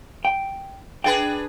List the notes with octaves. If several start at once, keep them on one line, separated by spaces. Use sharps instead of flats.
G5
D4 G#4 B4 G5